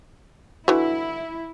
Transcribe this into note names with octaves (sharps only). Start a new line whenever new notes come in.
D3 E3 E4 F#4